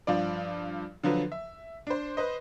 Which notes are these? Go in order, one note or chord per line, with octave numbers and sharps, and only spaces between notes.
G2 F3 F4 D5
D3 F3 F#3 B4
E5
D4 C5
B4 C5 D#5